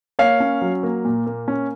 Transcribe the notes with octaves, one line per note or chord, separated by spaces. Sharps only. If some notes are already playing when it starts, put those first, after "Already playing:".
A#3 C#5 F5
C#4
F#3
A#3
A#2
A#3
C#4